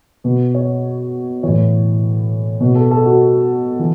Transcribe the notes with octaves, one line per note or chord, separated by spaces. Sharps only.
B2 B4
C#5
A2 E3 C#5
B2 B4
A4
A4
F#4
E3